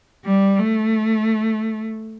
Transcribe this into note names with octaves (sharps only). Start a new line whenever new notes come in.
G3
A3